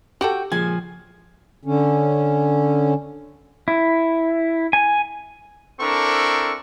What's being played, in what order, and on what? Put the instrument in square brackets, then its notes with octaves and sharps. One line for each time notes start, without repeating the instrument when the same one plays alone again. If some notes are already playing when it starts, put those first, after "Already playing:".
[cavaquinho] F#4 G5 [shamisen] G4 A4 [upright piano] F#7
[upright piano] A#2 C#3 G#3 [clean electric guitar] F3 [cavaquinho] G#5
[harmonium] D3 C#4
[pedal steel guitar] E4
G#5
[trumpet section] C4 D4 E4 A4 A#4 C#6